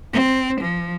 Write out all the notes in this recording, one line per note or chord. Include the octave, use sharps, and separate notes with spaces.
C4
F3